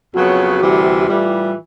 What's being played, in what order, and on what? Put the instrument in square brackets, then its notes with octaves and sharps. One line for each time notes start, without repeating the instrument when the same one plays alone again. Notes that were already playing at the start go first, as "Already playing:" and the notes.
[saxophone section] F2 C#3 F#3 B3 [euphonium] F#4
[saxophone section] D2 C3 E3 G3
[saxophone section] A2 E3 G3 [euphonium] F4